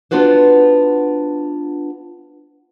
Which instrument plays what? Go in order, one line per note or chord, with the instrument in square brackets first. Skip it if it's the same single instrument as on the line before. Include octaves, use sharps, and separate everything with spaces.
[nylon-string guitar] B3 D4 F4 F#4 B4 C5